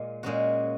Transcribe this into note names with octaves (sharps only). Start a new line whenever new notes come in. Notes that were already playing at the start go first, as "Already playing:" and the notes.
Already playing: A#2 G#3
A#2 G#3 C#4 F#4